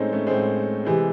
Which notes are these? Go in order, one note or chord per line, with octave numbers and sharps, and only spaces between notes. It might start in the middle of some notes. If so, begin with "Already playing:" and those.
Already playing: A2 G#3 A3 C4 C#4 D#4
A3 C#4
A2 G#3 C4
C3 E3 G#3